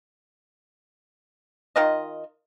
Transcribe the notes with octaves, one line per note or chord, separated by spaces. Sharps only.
D#3 F4 D#5